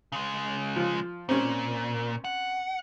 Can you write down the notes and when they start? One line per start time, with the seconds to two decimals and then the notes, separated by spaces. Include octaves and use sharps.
0.12 C#3 G#3
0.76 F3
1.29 A#2 C4 C#4
2.25 F#5